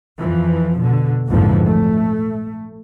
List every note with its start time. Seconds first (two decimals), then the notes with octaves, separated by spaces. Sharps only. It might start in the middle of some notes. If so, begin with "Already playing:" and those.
0.18 F2 E3 F3
0.80 B2 D3
1.28 A#1 F2 G#2 D3 E3 F3
1.67 A3